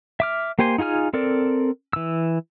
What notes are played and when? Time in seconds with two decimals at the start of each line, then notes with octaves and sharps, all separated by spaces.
0.20 E5 D6 F6
0.59 A#3 G4 C5 G#5 C6
0.78 D#4 F4 G#4 G#5 F6
1.13 C4 A4 A#4 D5
1.93 E3 E6